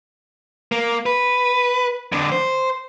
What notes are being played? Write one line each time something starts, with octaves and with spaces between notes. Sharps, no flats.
A#3
B4
F2 D3
C5